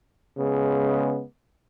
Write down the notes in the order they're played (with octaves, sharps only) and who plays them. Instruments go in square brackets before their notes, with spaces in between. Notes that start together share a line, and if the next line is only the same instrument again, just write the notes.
[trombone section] C#3 G#3 B3